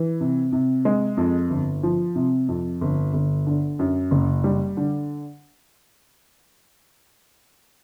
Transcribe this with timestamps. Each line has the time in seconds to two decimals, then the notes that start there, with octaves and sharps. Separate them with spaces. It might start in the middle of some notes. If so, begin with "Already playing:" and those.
Already playing: E3
0.21 C3
0.53 C3
0.85 G#3
1.17 F2
1.50 G1
1.83 F3
2.15 C3
2.49 F2
2.81 G1
3.14 G1
3.47 D3
3.79 F#2
4.11 F#1
4.44 G3
4.77 D3